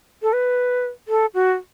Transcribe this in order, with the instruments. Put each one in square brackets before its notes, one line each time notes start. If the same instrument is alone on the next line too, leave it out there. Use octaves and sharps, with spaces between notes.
[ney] A4
B4
A4
F#4